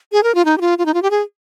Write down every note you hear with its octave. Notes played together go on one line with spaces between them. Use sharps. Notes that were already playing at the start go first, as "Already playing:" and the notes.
G#4
A#4
F4
D#4
G4
F4
F4
D#4
F4
G4
G#4